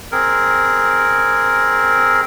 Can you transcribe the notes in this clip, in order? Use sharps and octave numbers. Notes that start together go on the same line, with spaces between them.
C4 G#4 A#4